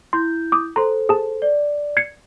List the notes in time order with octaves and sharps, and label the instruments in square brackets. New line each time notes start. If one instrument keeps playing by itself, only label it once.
[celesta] E4 G6 [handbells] C6
[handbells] D6 D#6
[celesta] A4 C5 [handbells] A#5 C6
[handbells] G#4 A5
[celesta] D5
[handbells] G#6 C7 C#7